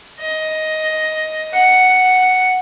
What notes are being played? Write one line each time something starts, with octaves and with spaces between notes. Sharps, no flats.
D#5
F#5